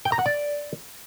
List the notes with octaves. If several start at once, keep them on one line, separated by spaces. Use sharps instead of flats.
G5
A#5
F#5
D5